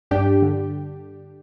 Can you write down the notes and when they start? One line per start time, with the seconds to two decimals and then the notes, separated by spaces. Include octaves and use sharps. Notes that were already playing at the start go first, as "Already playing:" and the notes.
0.11 G2 D4 G4
0.42 D3